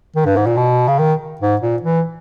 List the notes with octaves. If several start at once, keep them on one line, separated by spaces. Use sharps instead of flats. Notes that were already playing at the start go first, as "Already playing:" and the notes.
D#3
G2
G#2
A#2
B2
C#3
D#3
G#2
A#2
E3